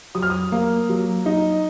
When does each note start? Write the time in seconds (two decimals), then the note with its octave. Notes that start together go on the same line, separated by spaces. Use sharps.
0.15 F#3 D#6
0.22 F6
0.30 D#6
0.52 A#3
0.89 F#3
1.26 D#4